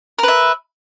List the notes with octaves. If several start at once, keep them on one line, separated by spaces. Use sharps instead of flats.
A#4 B4 E5